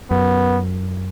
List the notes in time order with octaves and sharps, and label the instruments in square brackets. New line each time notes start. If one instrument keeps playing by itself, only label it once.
[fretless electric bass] F#2 [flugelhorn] B3